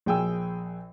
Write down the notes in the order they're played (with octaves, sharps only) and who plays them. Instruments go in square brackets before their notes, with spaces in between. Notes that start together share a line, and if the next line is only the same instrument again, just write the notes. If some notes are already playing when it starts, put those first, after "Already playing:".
[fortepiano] A#1 G#4 G5 G#5 E6